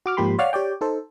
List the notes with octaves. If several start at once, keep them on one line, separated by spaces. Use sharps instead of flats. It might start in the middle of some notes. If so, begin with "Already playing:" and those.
F#4 D6 F6
G#2 F3 A#3 G4 B5 C6
C#5 D5 F5 F#5 F6
G4 C#5 D5 G5
D#4 A4 C5